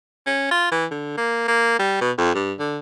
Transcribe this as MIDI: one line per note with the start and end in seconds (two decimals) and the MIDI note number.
0.26 0.50 61
0.51 0.68 65
0.71 0.86 52
0.91 1.14 50
1.17 1.47 58
1.48 1.79 58
1.79 1.98 55
2.01 2.11 47
2.18 2.33 41
2.34 2.53 43
2.59 2.79 50